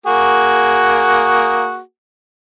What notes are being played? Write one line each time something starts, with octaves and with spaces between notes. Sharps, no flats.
A#3 F#4 G#4